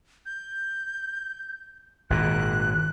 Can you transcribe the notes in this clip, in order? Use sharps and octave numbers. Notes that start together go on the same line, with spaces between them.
G6
G#1 A#2 F#6